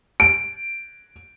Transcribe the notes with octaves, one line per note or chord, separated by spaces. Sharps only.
D7